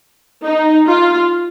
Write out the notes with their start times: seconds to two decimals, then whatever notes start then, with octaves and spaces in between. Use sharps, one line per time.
0.44 D#4
0.87 F4